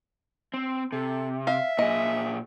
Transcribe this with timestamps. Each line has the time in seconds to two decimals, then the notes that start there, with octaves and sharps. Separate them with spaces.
0.54 C4
0.92 C3 A4
1.47 E5 F5
1.79 A#2 G#4 D#5